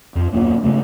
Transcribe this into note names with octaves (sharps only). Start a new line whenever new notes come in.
F2
D#1 F#2 B2 A#3
G#2 C#3 A3